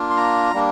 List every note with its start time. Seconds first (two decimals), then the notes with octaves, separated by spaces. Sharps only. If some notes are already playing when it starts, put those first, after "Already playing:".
Already playing: A#3 D4 F4
0.10 C6
0.17 A#5
0.54 G3 A#3 D4